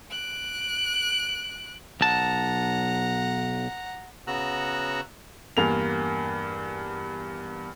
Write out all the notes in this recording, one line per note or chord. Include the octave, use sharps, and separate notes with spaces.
F#6 D7
B1 F#5 A5 A#5
C#3 B3 F#4 A#5 E6 F#6
E2 G2 A#3 F7